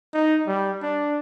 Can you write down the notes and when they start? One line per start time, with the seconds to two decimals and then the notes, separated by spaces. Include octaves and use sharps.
0.14 D#4
0.47 G3
0.82 D4